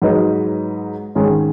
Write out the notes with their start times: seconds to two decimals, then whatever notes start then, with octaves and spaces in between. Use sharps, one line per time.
0.02 G#2 F#3 D#4 B4 D#5
1.15 G#2 D#3 G#3 C#4 G#4